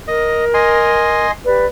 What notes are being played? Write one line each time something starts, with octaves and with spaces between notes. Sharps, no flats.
A#4 D#5
D#5 G#5 C6
G4 B4 D5